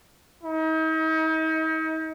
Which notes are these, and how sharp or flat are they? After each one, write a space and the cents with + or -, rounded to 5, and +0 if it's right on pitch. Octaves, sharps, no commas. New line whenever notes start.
D#4 +40